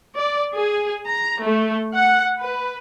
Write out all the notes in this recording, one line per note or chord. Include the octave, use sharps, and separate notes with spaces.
D5
G#4
A#5
A3
F#5
B4